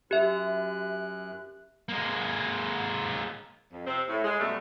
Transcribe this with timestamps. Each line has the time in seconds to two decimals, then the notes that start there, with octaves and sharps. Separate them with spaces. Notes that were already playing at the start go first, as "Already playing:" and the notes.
0.11 F#2 G4 E5 F#6
1.89 G#3 A#3
3.71 F2
3.86 C3 C4
4.08 A2
4.24 G#3
4.39 F#2 B2 G3 A3